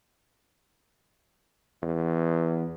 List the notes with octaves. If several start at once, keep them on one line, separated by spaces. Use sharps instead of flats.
E2